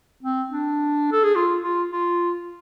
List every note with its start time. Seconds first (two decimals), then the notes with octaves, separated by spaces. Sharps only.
0.23 C4
0.51 D4
1.12 A4
1.24 G#4
1.36 F4
1.63 F4
1.92 F4